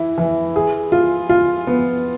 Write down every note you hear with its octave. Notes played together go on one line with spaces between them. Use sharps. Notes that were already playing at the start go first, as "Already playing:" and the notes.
Already playing: E3 E4
E3
G#4
F4
F4
B3